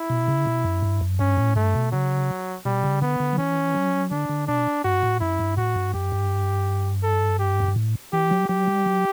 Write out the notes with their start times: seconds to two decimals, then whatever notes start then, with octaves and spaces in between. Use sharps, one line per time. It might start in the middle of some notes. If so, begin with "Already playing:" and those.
Already playing: E4
0.10 B2
0.28 C#3
0.46 B2
0.64 F#2
0.82 G2
1.01 F#2
1.19 G2 C#4
1.37 A2
1.56 G2 A3
1.74 B2
1.92 C#3 F#3
2.65 B2 G3
2.84 C#3
3.01 D3 B3
3.20 D3
3.33 F#3
3.38 E3 C#4
3.75 F#3
4.11 D3 D4
4.29 D3
4.48 B2 D4
4.84 G2 F#4
5.03 A2
5.20 F#2 E4
5.39 G2
5.57 A2 F#4
5.75 G2
5.94 F#2 G4
6.12 G2
7.03 A4
7.39 G4
7.60 F#2
7.68 G2
7.76 A2
8.13 E3 G4
8.31 F#3
8.49 F#3 G4
8.67 G3
8.86 F#3